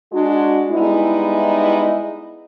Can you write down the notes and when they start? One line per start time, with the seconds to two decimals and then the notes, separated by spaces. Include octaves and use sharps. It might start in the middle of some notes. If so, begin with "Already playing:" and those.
0.13 G#3 D4 F#4
0.70 G3 G#3 B3 D#4 E4